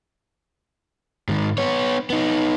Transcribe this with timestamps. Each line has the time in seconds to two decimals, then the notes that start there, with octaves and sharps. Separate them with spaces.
1.28 G#2 D#3
1.58 B3 C#5
2.10 B3 D#4